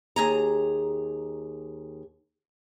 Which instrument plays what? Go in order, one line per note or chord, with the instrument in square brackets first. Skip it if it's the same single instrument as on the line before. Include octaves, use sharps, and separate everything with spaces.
[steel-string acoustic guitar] D#2 G#4 A#5